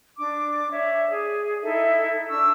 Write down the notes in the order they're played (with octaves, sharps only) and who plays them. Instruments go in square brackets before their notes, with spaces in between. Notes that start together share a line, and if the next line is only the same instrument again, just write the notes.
[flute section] D4 D6
C#5 D5 E5
G#4
D#4 E4 A4 E5
D4 C#6 E6